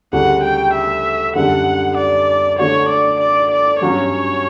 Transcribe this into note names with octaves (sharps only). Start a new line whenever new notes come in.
D2 C#3 G3 F#5
G5
E5
F#2 D3 G3 F#5
D5
D3 A3 D4 F#4 C#5
D5
D5
D5
G2 F#3 C#4 F#4 C#5